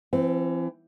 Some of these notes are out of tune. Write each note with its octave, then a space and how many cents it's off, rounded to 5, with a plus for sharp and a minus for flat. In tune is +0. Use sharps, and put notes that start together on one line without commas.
E3 +40 C4 +0